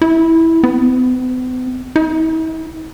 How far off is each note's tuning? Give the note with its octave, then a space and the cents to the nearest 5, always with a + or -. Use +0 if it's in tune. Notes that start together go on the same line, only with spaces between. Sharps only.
E4 -10
B3 +45
E4 -45